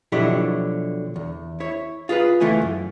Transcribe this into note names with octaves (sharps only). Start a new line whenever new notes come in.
B2 D3 F3 F#3 E4 G4
E2
E4 C#5
F4 G#4 A4 B4
C#2 E3 A3 F4 G#5
F#2